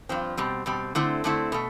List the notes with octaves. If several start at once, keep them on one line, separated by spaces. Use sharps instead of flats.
G2 F3 C4
B2 G3 C4
B2 G3 C4
D3 A3 C4 E4
D3 A3 C4 E4
B2 A3